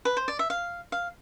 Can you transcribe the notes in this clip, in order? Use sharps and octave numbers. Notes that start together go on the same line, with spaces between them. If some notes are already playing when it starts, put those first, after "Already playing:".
B4
C5
D5
E5
F5
F5